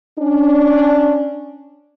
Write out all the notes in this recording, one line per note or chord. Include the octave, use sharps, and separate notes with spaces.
C#4 D4